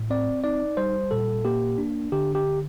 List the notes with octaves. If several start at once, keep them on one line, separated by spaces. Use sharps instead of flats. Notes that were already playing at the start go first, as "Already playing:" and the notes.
Already playing: A2
C4 D5
D#4 D5
G3 C5
A#2 A4
A#3 G4
D4
D3 G4
G4